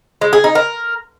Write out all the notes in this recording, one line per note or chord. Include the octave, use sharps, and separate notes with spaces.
G#3
G#4
D#4
A#4